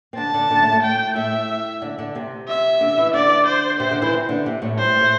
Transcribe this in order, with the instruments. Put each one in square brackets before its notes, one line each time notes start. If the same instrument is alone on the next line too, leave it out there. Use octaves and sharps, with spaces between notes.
[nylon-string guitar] C4
[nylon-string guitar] D3 D4 [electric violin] A5
[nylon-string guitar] D3 D4
D3 D4
A2 A3
A2 A3
[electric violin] G5
[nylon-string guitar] A2 A3 [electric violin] E5
[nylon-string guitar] D3 D4
D3 D4
C3 C4
[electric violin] E5
[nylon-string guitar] D3 D4
E3 E4
[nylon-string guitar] D3 D4 [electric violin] D5
[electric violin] C5
[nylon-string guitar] C3 C4 [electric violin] C5
[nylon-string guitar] D3 D4
E3 E4
C3 C4
D3 D4
C3 C4
A2 A3
[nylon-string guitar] G3 [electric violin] C5
[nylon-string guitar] G3
A2 A3